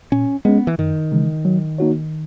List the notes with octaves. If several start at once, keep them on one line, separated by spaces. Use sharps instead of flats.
A#2 C#4
G#3 B3 C#4
E3
F#2 D#3
C#3 E3 G#3
F#3
A#3 D#4 F#4 C#5